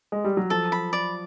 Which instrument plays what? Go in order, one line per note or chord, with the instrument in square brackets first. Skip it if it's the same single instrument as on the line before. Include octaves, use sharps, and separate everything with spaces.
[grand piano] G#3
G3
F#3
[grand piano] F3 [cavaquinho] A4
[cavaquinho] B5
D5